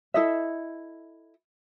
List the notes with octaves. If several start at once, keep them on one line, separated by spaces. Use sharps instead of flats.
E4 A4 D#5 E5